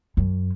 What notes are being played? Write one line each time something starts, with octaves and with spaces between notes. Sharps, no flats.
F#2